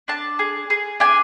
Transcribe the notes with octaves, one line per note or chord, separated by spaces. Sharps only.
D4 A5
G#4
G#4
D4 G#5